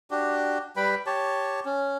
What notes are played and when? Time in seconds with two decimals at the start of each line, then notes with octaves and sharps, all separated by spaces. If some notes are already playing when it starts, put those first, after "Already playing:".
0.11 D4 F#4 G4
0.76 G3 B4 G5 B5
1.06 G4 C#5 A5
1.65 C#4